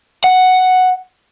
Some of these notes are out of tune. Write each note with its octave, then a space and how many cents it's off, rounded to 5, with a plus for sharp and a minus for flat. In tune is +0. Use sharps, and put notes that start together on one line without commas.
F#5 +0